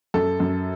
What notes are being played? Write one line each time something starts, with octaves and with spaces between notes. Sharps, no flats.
F#2 A4
F#2